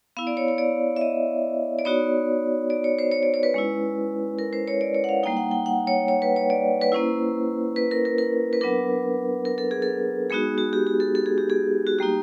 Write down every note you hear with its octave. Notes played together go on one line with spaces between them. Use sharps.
B3 E4 F5
D5
C#5
C#5
D5
E5
D#5
D5
B3 D#4 F#4 C#5
D5
C#5
C5
C#5
D5
C#5
B4
G#3 C#4 E4
A#4
C5
C#5
D5
C#5
F#5
F5
G3 A#3 D#4 G5
F#5
G5
F#5
C#5
C#5
B4
C#5
D5
B4
A#3 C#4 E4 C5
B4
A#4
A#4
A#4
B4
F#3 B3 D4 A#4
A#4
A4
G#4
A4
G#3 B3 D#4 F#4 G#4
F#4
G4
G4
A4
A4
G#4
G4
G#4
F#4
G3 A#3 D#4 G4